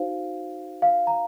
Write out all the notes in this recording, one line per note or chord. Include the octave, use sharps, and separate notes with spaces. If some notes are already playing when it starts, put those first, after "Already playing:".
Already playing: D#4 F#4 C5 F5
F5
A#5